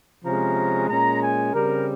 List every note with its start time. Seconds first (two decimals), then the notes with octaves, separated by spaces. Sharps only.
0.25 C3 F3 G#3 C#4 A#5
0.89 A#2 G#3 C#4 A#5
1.21 G#5
1.52 C#3 G3 C4 A#4